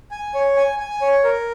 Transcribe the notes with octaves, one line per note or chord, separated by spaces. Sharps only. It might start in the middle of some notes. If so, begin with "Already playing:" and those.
G#5
C#5
G#5
G#5
C#5
A#4